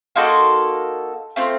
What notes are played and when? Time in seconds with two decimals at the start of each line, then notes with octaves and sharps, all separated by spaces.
0.16 A#3 D#4 F#4 A4 A5 C6
1.36 A3 C4 F4